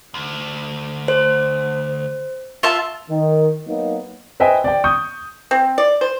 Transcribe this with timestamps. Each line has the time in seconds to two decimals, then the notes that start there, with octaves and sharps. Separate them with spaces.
0.14 D2
1.08 C5
2.63 F4 E5 A5
3.11 D#3
3.67 F#3 A#3 B3 D#4
4.40 B4 C5 D#5 E5 G5 G#5
4.64 D5 G5
4.84 C#6 D#6 G6
5.51 C4
5.78 D5
6.01 C5